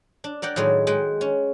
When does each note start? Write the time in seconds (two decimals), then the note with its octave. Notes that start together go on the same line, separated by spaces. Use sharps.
0.24 D4
0.42 A#4 D5 F#5 G5
0.56 A2 D#3 F#3 G#3
0.87 G#3 F#5 G5
1.21 C#4